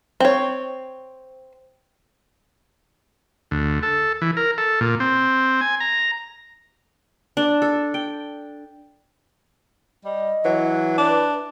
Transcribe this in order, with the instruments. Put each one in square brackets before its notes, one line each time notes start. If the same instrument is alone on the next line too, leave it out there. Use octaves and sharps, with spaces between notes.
[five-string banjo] C4 C#5
[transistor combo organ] D2
A4
E3
A#4
A4
A#2
C4
G#5
A#5
[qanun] D4
A4
G5
[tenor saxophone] G3 [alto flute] D#5
[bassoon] E3 [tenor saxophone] F#3
[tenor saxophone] D4 [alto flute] B4